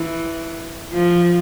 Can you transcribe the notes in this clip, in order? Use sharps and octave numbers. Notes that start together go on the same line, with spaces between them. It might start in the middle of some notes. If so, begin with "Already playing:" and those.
Already playing: E3
F3